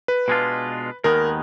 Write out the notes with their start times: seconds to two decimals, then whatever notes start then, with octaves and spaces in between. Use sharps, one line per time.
0.08 B4
0.28 B2 G#3 D4 F4
1.04 D#2 D#3 G#3 B3 A#4